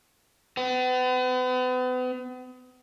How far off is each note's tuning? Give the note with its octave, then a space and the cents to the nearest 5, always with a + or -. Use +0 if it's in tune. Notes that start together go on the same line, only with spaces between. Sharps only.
B3 +40